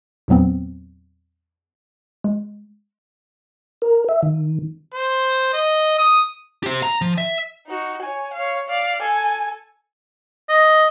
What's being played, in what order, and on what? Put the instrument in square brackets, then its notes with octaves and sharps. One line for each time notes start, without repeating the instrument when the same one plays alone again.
[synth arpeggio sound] E2 A#2 F#3 B3 C4
G#3
[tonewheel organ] A#4
E5
D#3
[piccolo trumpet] C5
D#5
D#6
[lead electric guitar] G4 C5
A#5
F3
E5
[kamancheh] D#4 F#4
C#5 G#5
C#5 F5
D5 F5
A4 G#5
[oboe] D#5